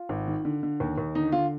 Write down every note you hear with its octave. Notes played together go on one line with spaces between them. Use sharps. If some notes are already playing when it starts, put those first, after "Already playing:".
Already playing: F4
G#1
D#3
D3
D3
D#2
D#2
D3 D#4
D3 F4